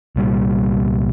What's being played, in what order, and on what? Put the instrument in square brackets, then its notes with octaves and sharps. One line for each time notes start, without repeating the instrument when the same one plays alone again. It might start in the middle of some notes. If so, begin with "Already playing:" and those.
[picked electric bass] C2 A#2 G3